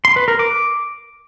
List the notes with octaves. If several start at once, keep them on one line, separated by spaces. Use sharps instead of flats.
C6
B4
A#4
D6